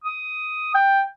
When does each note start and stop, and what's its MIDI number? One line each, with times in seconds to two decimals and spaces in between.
0.04 0.75 87
0.75 1.03 79